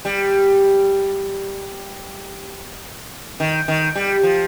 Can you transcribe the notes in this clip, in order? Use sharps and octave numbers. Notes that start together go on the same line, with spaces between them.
G3
D#3
D#3
G3
F3